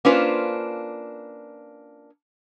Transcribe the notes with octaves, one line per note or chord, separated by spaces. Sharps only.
A#3 C#4 D4 F4 B4 C5